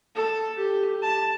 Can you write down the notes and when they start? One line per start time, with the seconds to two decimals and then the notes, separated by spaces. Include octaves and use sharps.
0.15 A4
0.57 G4
1.02 A5